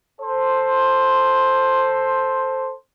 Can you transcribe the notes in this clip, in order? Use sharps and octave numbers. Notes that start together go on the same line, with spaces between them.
A4 C5